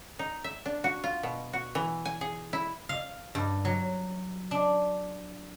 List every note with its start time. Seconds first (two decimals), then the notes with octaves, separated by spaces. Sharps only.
0.19 D#4
0.44 E5
0.66 D4
0.84 F#4
1.04 F4
1.23 B2
1.53 F#4
1.75 E3
2.05 G#5
2.21 G#4
2.53 E4
2.89 F5
3.35 G2
3.65 F#3
4.51 D4